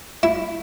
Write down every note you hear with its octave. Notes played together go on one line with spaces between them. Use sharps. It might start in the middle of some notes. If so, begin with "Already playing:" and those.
E4